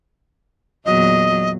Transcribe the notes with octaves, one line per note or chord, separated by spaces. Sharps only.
E2 A#2 F#3 D#5